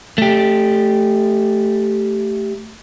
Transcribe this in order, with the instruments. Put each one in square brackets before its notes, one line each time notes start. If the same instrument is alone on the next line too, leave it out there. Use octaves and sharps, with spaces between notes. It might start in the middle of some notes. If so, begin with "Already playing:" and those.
[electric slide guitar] A3 G4